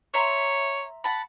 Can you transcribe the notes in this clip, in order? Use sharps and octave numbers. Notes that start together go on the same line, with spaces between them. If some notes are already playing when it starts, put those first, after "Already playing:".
C#5 E5 A#5 C6
F#5 A5 B5